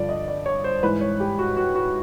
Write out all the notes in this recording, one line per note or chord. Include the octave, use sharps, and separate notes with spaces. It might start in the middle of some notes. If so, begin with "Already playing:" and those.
Already playing: G2 D3 F3 D5
D#5
D5
C#5
C5
G#2 E3 B4
C#5
G4
F#4
F#4
F#4